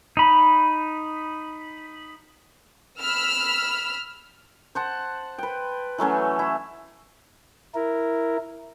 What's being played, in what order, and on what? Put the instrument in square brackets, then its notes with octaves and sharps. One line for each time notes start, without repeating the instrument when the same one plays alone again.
[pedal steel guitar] D#4 B5
[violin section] B5 E6 F6
[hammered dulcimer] C5 F#5 A5
B4 G5
E3 F#3 A3 C#4
E4
[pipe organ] E4 A#4